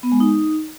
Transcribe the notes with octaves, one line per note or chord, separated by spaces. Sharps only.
B3
G#3
D#4